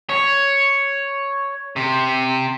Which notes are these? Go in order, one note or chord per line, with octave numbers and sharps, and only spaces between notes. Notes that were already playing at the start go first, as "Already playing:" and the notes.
C#5
C3